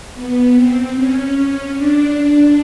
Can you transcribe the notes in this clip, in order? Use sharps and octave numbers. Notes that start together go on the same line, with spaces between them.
B3
C4
C#4
D4